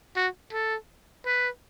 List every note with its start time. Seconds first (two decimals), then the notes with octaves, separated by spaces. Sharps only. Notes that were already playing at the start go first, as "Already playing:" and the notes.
0.16 F#4
0.53 A4
1.26 B4